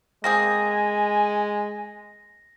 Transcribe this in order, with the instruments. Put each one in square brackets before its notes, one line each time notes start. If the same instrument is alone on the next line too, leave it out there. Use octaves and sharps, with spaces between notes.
[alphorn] G#3 [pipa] A#3 C4 G#4 [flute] G#5 [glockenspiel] A#6